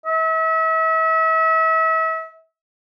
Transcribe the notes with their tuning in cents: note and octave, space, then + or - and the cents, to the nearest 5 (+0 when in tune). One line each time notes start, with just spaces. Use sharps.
E5 -35